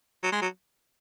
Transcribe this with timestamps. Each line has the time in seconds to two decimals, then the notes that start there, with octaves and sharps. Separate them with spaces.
0.23 F#3
0.32 G#3
0.41 F#3